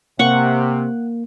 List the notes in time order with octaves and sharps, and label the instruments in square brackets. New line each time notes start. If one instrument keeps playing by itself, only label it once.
[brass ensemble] C3 [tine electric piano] A#3 [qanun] F#5 C#6